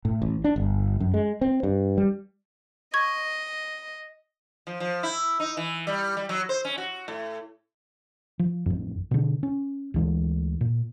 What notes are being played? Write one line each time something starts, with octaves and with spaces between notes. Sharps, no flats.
A2
A1
D4
G1
F#2
G#3
C4
G2
G3
D#5 C#6 G#6
F3
F3
E4
D#4
E3
G3
G3
F#3
C5
C#4
F#4
A2
F3
A1 F2
B2 D3
C#4
D2 E3 G#3
A#2